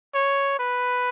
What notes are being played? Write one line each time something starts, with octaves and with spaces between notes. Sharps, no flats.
C#5
B4